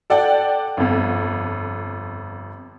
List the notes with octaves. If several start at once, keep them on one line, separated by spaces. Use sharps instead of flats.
A4 D5 F#5 G5
G1 F2